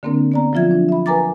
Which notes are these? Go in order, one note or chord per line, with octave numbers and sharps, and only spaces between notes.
D3 A#3 C4 D4 A#4
B3 D5 A#5
F3 F#3 F4 E5 G#6
D4
E5 B5
A#4 B4 G#5 A#5 D6 A6